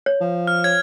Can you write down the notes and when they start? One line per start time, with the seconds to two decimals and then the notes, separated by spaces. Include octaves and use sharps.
0.06 C#5
0.21 F3
0.47 F6
0.64 C#5 G#6